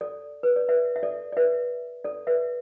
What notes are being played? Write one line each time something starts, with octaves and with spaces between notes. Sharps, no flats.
A4 D5
B4
D5
B4 E5
E5
A4 D5
D5
B4 E5
A4 D5
B4 E5